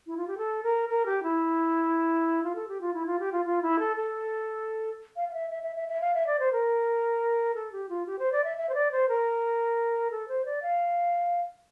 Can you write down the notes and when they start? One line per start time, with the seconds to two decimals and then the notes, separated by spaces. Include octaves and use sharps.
0.07 E4
0.17 F4
0.28 G4
0.37 A4
0.63 A#4
0.89 A#4
1.06 G4
1.23 E4
2.43 F4
2.55 A4
2.68 G4
2.81 F4
2.94 E4
3.06 F4
3.20 G4
3.32 F4
3.45 F4
3.62 E4
3.79 A4
3.96 A4
5.16 F5
5.28 F5
5.33 E5
5.50 E5
5.63 E5
5.76 E5
5.89 E5
6.01 F5
6.14 E5
6.27 D5
6.40 C5
6.53 A#4
7.55 A4
7.72 G4
7.89 F4
8.06 G4
8.19 C5
8.32 D5
8.44 E5
8.58 E5
8.69 C5
8.74 D5
8.92 C5
9.09 A#4
10.11 A4
10.28 C5
10.46 D5
10.63 F5